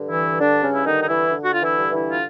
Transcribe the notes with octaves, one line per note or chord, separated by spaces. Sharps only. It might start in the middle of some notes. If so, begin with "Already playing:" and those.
Already playing: G2 D3
E3 E4
G2 D3 D4
C#3 C#4
E4
D3 D#3 D#4
D#4
E3 E4
D3
F#4
F4
E3 E4
G2
E3 E4
F4